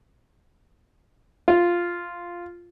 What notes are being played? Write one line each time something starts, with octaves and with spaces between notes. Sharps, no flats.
F4